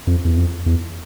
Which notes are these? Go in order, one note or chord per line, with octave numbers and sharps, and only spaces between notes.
F2
E2
F2
E2